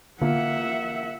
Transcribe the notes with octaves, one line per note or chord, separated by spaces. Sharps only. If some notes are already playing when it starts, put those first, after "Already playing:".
D3 A#3 F4 E5 F#5